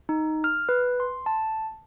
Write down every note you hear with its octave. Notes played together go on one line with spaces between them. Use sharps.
D#4
F6
B4
C6
A5